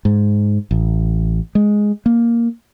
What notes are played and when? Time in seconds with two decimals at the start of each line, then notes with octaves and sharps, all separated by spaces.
0.05 G#2
0.71 A1
1.55 G#3
2.06 A#3